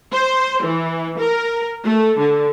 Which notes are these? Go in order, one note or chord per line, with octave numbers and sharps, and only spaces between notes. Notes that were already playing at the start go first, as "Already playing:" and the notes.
C5
E3
A#4
A3
D3